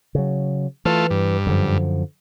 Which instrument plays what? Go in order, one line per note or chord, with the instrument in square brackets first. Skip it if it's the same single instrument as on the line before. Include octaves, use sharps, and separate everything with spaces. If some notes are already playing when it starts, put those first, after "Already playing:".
[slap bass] C#3 F#3
[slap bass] E3 [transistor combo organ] A3 F4
[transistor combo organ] G2
[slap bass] F#2 D3 F3